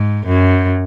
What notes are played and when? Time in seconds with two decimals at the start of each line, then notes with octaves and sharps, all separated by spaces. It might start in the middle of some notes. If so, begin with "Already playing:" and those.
Already playing: G#2
0.26 F#2